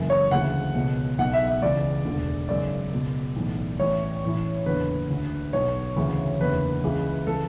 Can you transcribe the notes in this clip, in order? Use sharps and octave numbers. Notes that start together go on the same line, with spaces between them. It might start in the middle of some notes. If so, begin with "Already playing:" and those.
Already playing: F#1 F#2 E3
C#5
D2 C#3 E3 F#5
C#2 B2
B1 B2 F#5
E5
E5
C#2 C#3 E3 D5
E1 D2 D3
G#1 F#2 C#3 D5
C#2 B2
B1 A2 E3
A1 A2 E3 C#5
A1 A2 E3
F#1 E2 D3 B4
D2 D3
B1 B2 C#5
D2 C#3 E3
F#1 E2 D3 B4
C#2 C#3 E3
C#3 E3 A4